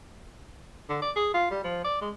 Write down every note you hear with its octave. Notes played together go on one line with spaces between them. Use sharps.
D3
D5
G#4
F4
G3
F3
D5
G#3